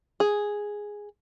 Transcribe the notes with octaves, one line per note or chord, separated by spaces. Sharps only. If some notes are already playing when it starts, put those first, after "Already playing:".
G#4